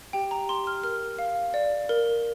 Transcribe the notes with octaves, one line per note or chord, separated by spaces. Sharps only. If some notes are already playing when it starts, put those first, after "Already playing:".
G4 G5
A#5
G4 C6
F6
A#4 F6
F5
D5
A#4